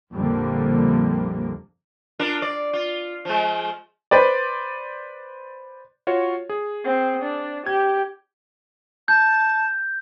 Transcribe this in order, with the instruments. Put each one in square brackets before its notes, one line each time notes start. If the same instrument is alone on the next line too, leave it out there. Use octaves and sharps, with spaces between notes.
[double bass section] A#1 F2 D3 G3 A#3
[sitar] D4 F4 A#4
D5
F4
F3 G#3
[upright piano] B4 C5 D5
[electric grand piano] F4 F#4 C#5
G#4
[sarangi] C4
D4
[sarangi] G4 [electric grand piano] G#6
[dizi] A5 [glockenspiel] G6